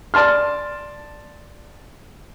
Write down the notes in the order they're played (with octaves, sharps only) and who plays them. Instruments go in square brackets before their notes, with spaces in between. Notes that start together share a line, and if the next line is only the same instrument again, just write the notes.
[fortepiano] D5 A5 C6 F6